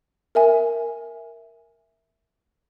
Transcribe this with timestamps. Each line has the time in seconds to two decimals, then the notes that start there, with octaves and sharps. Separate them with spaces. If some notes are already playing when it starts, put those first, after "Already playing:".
0.35 A#4 E5 G#5